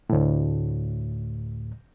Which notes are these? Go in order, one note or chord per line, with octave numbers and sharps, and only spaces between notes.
D2 A2